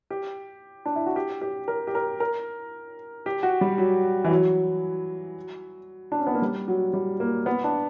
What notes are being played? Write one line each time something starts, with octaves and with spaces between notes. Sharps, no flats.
G4
D4
E4
F#4
G4
G4
A#4
G4
A#4
A#4
G4
F#4
G3
F#3
E3
F#3
D4
C#4
B3
A#3
G3
F#3
G3
A#3
B3
D4